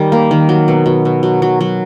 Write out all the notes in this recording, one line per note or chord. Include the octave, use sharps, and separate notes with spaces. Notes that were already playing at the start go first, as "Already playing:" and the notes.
Already playing: D#3 G3
A#3
D#3
F#3
B2
B2
B2
F#3
F#3
F#3